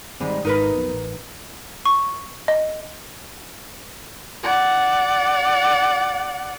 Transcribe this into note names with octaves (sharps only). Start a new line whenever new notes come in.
G#2 D#3 G3 G#3 C4
G#1 G#2 D#4 A#4 B4
B1 F2 B2
A1
C#6
D#5
D5 F#5